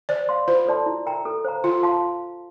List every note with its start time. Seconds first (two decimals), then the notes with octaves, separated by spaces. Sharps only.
0.09 C5 D5
0.29 F5 C6
0.48 F4 C5
0.67 A4 D5 A5 C6
0.86 E4
1.06 A#4 E5 G5 A#5
1.25 A4
1.45 C5 F5 A#5
1.63 F4 C5
1.83 F5 A5 C6